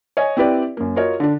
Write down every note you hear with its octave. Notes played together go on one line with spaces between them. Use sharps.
C#5 D#5 G#5
C4 E4 G4 B4 D5
F#2 A#3
F4 F#4 A#4 C#5 D#5
D3 D4